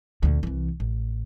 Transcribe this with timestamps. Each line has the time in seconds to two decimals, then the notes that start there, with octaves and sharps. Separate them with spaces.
0.23 D2 A#2
0.43 C2 E3
0.80 A1